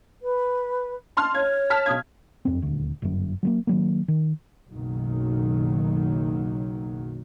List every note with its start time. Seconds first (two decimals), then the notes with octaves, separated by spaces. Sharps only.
0.22 B4
1.17 A5 C6 F6
1.35 C#5 G#6
1.70 A5 F6 B6
1.86 B1 D#6 G#6
2.45 F#1 F2 C4
2.62 D#1 D2
3.02 G1 F#2
3.43 F#3 G3 A#3
3.67 D#3 F#3 A#3
4.08 D#3
4.69 F#1 B1 D#3 F#3